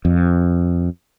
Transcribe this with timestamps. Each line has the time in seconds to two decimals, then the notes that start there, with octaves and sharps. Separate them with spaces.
0.05 F2